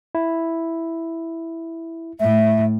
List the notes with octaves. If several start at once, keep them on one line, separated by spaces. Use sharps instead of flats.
E4
A2 E5